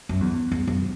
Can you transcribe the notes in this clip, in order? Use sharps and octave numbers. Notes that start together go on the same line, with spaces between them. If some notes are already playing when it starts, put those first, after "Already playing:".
F#2
E2
E2
F#2